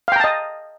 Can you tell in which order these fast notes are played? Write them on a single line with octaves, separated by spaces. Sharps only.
F5 G5 A#5 A5 D#5